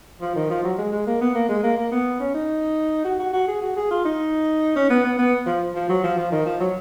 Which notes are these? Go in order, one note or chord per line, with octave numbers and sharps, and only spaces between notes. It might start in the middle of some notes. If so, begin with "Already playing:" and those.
F3
D#3
F3
F#3
G#3
G#3
A#3
B3
A#3
G#3
A#3
A#3
B3
C#4
D#4
F#4
F#4
F#4
G#4
F#4
G#4
F4
D#4
C#4
B3
B3
B3
F3
F3
F#3
F3
F3
D#3
F3
F#3